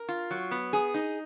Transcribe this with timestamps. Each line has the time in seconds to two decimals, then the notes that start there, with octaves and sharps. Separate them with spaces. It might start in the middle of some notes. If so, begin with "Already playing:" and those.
Already playing: A#4
0.09 F4
0.31 F#3
0.51 B3
0.73 G#4
0.94 D#4